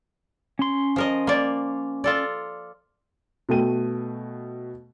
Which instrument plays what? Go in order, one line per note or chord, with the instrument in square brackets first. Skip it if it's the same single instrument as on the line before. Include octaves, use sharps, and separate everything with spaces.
[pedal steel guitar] C#4 C6
[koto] F3 A#4 D#5
A#3 D5
F4 A4 D5
[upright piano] B2 A3 G5 D#7